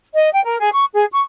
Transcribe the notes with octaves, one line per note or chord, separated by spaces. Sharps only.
D#5
G5
A#4
G#4
C#6
G#4
C#6